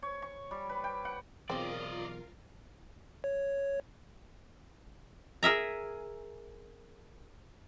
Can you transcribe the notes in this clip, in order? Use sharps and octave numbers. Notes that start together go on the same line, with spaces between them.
C#5
C#6
G3
B4
G5
F#5
B1 E2 C4 F4 A#4 D5 D#5 F5
C#5
G#4 A#4 E5 A#5